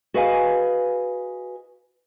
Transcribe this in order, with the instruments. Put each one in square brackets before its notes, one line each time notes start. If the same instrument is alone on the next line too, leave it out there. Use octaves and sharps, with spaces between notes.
[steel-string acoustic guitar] F#4 G#4 B4 D#5 F5 G#5